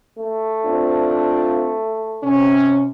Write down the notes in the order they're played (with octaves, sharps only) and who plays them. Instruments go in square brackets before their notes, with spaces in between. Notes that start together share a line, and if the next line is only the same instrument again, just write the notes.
[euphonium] A3
[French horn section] C4 D4 F4
C3 C#4